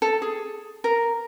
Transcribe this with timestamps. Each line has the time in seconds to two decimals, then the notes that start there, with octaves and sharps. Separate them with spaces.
0.02 A4
0.22 G#4
0.84 A#4